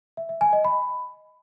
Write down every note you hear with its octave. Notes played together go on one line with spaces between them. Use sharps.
E5
E5
G#5
D#5
B5